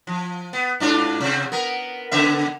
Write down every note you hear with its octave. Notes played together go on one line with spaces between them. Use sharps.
F3
B3
G#2 D4 F4
C3 C4
B3 A#4
C#3 B3 E5